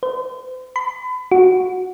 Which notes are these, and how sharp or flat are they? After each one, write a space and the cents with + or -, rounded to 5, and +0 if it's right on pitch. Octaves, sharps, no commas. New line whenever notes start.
C5 -40
B5 +35
F#4 -5